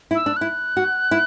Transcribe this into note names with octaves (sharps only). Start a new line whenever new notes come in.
E4
E6
D4
E4 F#6
F#4
E4